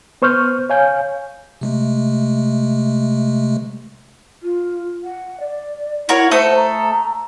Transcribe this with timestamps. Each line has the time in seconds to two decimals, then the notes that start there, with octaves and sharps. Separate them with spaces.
0.22 B3 C5 C#6 F6 G6
0.70 C#5 F5 G#5 G6
1.61 C3 G#3 A3
4.43 F4
5.03 F#5
5.40 D5
6.09 E4 F#4 A#4 C#5
6.31 A3 A4 C5 D#6
6.55 A#5